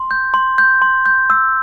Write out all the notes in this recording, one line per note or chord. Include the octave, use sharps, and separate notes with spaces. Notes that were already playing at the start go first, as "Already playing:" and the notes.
Already playing: C6
G6
C6
G6
C6
G6
E6